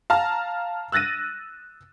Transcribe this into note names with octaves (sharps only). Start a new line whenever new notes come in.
F5 A5 A#5 F6
E6 F#6 A6 A#6 D#7